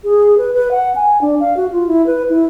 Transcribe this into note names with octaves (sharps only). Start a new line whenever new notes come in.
G#4
B4
B4
F#5
G#5
D4
F5
F#4
F4
E4
B4
E4